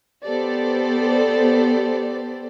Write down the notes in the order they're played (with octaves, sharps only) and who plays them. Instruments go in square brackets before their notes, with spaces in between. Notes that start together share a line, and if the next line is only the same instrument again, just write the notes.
[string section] B3 G4 A4 C5 D5